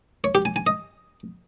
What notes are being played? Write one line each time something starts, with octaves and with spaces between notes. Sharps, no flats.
C#5
G4
G#5
G#5
D#5